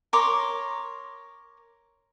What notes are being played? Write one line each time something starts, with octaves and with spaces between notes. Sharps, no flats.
A#4 C#5 C6 D6